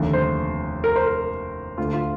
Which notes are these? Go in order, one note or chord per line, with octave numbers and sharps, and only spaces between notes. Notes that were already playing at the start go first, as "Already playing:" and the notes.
Already playing: F1 D#2 D3
C5
A#4
C5
A#4
D2 D3 F4
F4